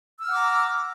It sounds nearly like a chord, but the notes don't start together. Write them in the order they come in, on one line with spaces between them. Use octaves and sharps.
E6 F6 F#5 D6 A#5